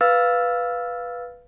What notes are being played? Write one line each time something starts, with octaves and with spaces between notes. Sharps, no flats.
B4 F5 E6 F6 A6